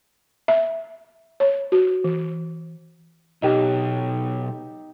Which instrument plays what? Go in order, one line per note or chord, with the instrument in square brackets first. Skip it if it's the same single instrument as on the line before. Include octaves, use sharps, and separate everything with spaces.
[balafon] E5
C#5
F#4
E3
[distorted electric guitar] B1 [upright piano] D#4 G4